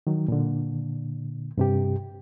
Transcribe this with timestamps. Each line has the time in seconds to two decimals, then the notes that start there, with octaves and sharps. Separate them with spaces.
0.07 D#3 F#3
0.28 A#2 D3
1.58 G2 C3 G4